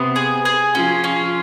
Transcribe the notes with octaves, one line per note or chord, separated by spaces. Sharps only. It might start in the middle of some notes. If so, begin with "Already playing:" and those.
Already playing: C3 B3 C4
G#4
G#4
F3 C#4 F4
C#4